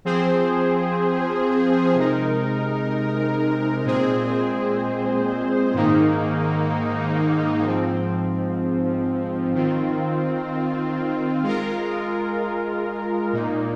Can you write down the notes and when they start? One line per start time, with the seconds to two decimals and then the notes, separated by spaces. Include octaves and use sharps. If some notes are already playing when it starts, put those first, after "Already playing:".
0.05 F3 C4 G#4 C5
1.95 C3 G#3 D#4 A#4
3.85 A#2 G#3 C4 G#4 C5
5.74 G#2 D#3 A#3 D#4
7.64 G#2 F3 C4
9.54 D#3 C4 F4
11.43 G#3 F4 A#4
13.33 A#2 A#3 D#4